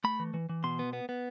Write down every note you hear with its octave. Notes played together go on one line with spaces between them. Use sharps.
A3 B5
E3
E3
E3
B2 C6
B3
B3
B3